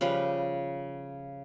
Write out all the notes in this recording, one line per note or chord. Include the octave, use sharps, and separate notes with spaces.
C#3 F3 G3 B4